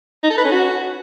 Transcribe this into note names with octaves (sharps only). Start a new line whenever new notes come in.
D#4
A4
B4
C#4
F#4